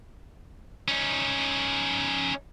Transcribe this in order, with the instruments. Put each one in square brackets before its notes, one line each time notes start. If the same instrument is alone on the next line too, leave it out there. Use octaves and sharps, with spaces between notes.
[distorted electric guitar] C#4 D#4